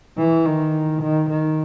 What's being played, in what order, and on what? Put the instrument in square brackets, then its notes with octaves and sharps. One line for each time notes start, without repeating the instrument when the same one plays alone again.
[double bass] E3
D#3
D#3
D#3